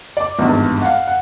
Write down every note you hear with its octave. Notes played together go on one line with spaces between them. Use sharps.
D5 D6
G#1 E2 G2
F5 F#5
F#5